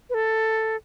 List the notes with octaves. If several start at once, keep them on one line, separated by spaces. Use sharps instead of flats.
B4
A4